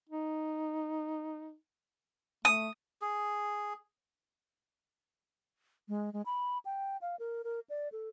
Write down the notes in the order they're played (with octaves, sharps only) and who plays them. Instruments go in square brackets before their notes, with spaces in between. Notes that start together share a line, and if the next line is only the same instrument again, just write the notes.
[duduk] D#4
[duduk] A3 [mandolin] D#6
[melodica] G#4
[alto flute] G#3
G#3
B5
G5
F5
A#4
A#4
D5
A4